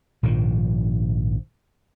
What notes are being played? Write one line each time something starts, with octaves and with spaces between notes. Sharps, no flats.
A#1 G#2 D#3 F3